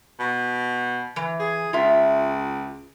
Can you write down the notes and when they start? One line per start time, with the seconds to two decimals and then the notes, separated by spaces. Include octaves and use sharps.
0.20 B2
1.16 E3
1.39 G#4
1.73 C#2 F4 E5